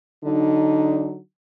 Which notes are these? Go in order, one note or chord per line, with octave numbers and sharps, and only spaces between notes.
D3 F#3 D4 D#4